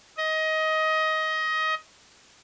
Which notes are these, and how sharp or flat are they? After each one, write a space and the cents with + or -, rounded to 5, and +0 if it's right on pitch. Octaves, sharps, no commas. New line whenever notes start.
D#5 +20